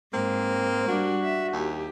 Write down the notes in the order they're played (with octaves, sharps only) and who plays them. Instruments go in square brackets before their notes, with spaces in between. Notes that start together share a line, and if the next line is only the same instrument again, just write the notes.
[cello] G#2 [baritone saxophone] A#3 [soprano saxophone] C4
[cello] G3 D4 [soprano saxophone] F#4
[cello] E5
[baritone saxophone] D#2 [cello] G4